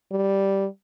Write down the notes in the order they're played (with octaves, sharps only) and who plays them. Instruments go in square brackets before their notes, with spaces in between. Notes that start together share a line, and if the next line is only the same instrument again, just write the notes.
[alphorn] G3